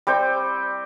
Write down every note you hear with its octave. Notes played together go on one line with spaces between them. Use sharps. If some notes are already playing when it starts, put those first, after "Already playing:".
G3 C4 G5